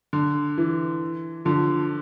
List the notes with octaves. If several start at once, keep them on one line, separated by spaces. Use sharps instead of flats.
D3
E3
D3 F3